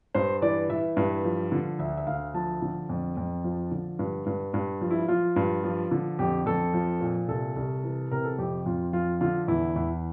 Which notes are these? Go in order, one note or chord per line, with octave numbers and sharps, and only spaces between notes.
G2 C5
E3 D5
E3 E5
G2
F3
D3
D2 E5
E5
D2 F5
F3 A5
D3
F2
F2
F3
D3
G2
G2
G2
F3
E4
F3 F4
G2
F3
D3
F2 G4
F2 A4
F3
A#2
C2 A4
C2
E3
C3 A#4
A4
F2 G4
F2 F4
F3 F4
D3 F4
E2 E4
E2